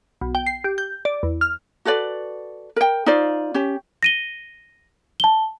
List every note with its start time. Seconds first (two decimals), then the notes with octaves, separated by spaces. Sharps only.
0.21 B1
0.35 G5
0.46 C7
0.64 G4
0.78 G6
1.05 D5
1.23 E2
1.41 F6
1.85 F#4 A4 B4 D5
2.76 A#4 G5
3.06 D#4 F4 C5 D5
3.54 C#4 G4
4.03 A#6 D#7 G7
5.20 A5 G7